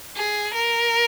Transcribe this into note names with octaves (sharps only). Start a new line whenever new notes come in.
G#4
A#4